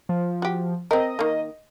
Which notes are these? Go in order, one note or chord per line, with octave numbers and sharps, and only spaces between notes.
F3
F#4 G4
C4 A#4 D#5
D#3 A#3